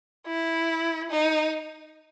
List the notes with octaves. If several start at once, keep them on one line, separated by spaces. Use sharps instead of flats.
E4
D#4